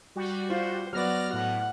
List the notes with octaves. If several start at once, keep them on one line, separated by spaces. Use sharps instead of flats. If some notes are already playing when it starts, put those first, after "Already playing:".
G3 F#4
F4 C5
F#3 B3 F#4 D5 F6 A#6
A2 F#5